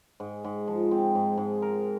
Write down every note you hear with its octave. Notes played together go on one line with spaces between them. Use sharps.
G#2
G#2
F3
C4
G#2
G#2
A#4